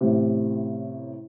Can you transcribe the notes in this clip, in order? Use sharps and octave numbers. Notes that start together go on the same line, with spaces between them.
A1 A2 C3